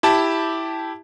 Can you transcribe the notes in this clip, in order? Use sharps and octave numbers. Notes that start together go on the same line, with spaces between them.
E4 G4 A5